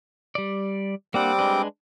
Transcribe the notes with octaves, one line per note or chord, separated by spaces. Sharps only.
G3 D5
G3 A#3 C4 D4 F#5 D6
G#3 D4 B4